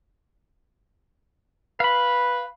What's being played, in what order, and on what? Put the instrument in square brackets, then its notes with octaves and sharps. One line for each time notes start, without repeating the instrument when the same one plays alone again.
[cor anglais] B4 [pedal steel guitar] F5 B5